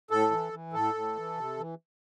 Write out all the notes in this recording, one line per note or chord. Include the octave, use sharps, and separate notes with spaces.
A2 A4
E3
E3
A2 A4
A2
E3
C3
E3